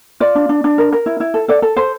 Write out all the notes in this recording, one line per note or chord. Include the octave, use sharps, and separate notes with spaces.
F4 D5
D4
D4
D4
A#4
A#4
E4
E4
A4
A4 D5
A4
A4 C5